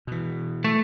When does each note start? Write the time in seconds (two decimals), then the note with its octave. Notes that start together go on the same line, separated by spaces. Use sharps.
0.07 B2 E3
0.64 A3